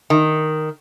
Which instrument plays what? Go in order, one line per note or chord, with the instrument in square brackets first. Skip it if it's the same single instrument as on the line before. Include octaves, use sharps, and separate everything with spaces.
[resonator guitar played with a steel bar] D#3